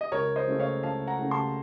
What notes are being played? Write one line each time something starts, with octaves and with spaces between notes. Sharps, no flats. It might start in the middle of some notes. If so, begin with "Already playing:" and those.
D#5
C#2 A#4 C#5
C5 D#5
C#3 A3
C#5 F5
C#2 F5 A5
F#5 A#5
C#3 A3
A5 C6